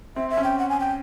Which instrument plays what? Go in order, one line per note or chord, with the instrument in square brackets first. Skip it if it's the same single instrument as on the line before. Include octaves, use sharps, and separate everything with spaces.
[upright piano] C4 [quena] E5
[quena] E5
[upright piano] C#4
[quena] G5
F#5
G#5
G5